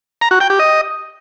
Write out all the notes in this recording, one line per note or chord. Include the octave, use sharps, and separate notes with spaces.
A#5
F#4
G5
G4
D#5